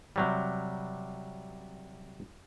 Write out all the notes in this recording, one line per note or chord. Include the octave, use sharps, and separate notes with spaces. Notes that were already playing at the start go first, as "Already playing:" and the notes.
C3 F#3 G3